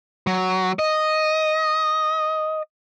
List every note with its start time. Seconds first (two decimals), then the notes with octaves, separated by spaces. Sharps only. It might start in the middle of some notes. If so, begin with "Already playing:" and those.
0.27 F#3
0.79 D#5